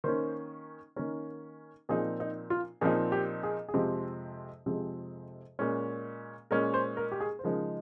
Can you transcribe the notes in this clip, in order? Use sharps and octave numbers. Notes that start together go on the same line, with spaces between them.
D#3 A#3 C#4 C5
D#3 A#3 C#4 A#4
A#2 F3 C4 D#4 G#4
D#4
F4
A#2 F3 C4 D#4 G#4
G4
G#4
G#4
F2 C3 F3 G#3 C4 G4
F2 C3 F3 G#3 C4 G#4
A#2 G#3 C#4
A#2 G#3 C#4 A#4
C5
A#4
G4
G#4
C5
C#3 F3 G#3 D#4 A#4